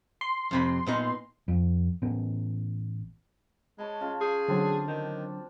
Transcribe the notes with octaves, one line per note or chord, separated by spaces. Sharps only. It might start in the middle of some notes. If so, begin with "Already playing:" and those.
C6
F2 C3 B5
A#2 B3 D#4
F2
A1 B3
G#3 C#5 A5 B5
C#3 F4 A5
G#4 G5
D3 F#3 C4 D4 A5
D#3 G5